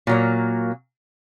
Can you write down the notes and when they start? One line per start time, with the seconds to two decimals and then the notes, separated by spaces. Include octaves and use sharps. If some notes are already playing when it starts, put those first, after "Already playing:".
0.07 A#2 F#3 A#3